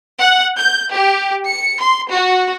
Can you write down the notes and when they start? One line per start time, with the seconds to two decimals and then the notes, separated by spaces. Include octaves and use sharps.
0.20 F#5
0.56 G6
0.89 G4
1.48 C#7
1.80 C6
2.09 F#4